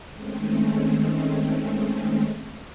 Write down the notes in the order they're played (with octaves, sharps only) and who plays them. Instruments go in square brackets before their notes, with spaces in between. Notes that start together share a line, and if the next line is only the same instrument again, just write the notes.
[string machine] D#3 G#3 A3 C4 C#4